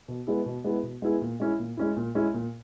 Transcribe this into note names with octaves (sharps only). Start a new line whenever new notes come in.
B2
G#3 B3 E4 G#4
B2
G#3 B3 E4 G#4
B2
G#3 B3 E4 G#4
A#2
G#3 C#4 E4
A#2
G#3 C#4 E4
A#2
G#3 C#4 E4
A#2